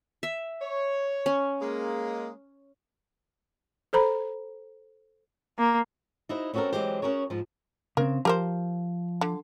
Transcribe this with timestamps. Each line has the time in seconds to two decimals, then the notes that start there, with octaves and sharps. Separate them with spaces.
0.23 E5
0.62 C#5
1.26 C#4
1.61 G#3 A#3
3.93 A4 C5 A#5 B5
5.59 A#3
6.29 D#4 E4 F#4 C5
6.54 C4 C#4 F#4 G4 A4 A#4
6.73 E3 F#3 G#3 C4 G4 C5
7.02 C#4 F#4 G#4 A#4 C#5
7.30 G#2 F3
7.97 C#3 C4 A#4
8.25 F3 G4 A#4 C5
9.21 D3